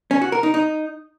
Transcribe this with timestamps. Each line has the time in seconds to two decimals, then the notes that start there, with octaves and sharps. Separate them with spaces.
0.11 C#4
0.22 F#4
0.32 A#4
0.43 D#4
0.54 D#4